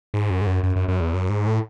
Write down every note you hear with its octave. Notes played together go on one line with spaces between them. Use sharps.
G#2
F#2
G#2
F#2
F#2
F#2
F#2
E2
F#2
G#2
A2